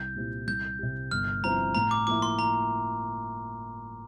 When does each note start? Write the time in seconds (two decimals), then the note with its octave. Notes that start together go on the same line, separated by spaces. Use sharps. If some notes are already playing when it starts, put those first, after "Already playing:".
Already playing: C2 G6
0.16 A#2 G3 C4 E4
0.47 C2 G6
0.79 C3 G3
1.11 G1 F6
1.43 G2 F3 C4 E4 A#5
1.75 A2 A#5
1.91 D6
2.07 F3 A#3 E4 D6
2.22 C6
2.39 A#5